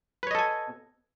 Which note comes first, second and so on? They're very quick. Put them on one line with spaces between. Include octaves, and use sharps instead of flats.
B4 C#5 D#5 A4 G#5